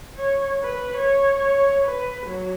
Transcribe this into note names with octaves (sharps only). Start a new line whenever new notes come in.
C#5
B4
C#5
C#5
B4
F#3